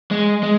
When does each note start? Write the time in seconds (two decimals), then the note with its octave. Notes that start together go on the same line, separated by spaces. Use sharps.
0.11 G#3
0.43 G#3